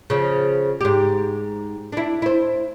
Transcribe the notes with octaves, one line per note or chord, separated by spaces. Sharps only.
C#3 F3
G#2 G4
D4 E4
E4 C5